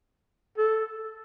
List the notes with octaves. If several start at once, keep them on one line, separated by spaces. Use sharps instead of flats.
A4